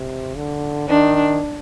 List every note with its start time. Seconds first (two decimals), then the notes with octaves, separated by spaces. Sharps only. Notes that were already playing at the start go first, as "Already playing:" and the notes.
Already playing: C3
0.37 D3
0.89 D#3 D4